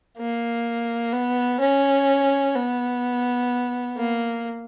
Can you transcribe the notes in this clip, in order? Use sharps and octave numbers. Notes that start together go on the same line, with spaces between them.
A#3
B3
C#4
B3
A#3